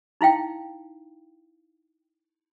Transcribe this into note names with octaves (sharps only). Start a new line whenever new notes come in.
D#4 E4 F5 G5